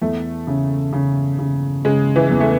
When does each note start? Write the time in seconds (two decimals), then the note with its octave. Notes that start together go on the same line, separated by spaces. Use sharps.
0.02 E2 A3
0.47 C#3
0.93 C#3
1.39 C#3
1.85 C#3 G#3
2.16 E3
2.31 E2
2.40 A3